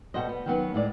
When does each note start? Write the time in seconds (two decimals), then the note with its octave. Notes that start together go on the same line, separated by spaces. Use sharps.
0.14 B2 G3 F#4 A4 C5 D#5
0.29 B3
0.46 D#3 F#3 B3 C#4
0.74 A2 G#3 D5